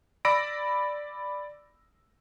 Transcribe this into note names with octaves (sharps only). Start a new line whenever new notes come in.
D5 B5 E6 A#6 D7